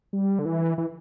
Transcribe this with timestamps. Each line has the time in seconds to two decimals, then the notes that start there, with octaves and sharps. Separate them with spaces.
0.13 G3
0.39 D3
0.45 E3
0.78 E3